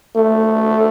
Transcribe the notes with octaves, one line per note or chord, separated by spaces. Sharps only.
A3